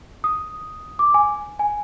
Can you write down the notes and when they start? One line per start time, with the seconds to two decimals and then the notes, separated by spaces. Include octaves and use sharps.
0.24 D#6
0.99 D6
1.14 G#5
1.59 G#5